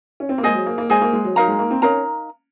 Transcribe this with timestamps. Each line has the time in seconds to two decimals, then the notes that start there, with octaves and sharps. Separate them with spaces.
0.20 C#4
0.29 C4
0.38 A#3
0.43 G#3 G#4 C5 D#5 G#5
0.55 F#3
0.66 A#3
0.78 A#3
0.90 G#3 G#4 C5 D#5 G#5
1.01 A#3
1.13 G#3
1.24 F#3
1.36 F#3 D#4 A#4 F5 A#5
1.48 G#3
1.59 A#3
1.71 C4
1.82 C#4 D#4 A#4 F5 A#5